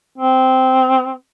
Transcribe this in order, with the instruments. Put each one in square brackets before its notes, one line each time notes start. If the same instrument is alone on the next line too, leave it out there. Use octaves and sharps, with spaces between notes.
[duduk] C4